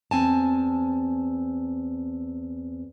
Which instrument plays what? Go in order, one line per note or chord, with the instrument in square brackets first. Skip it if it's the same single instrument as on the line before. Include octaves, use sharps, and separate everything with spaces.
[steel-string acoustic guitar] E2 C4 G#5 A5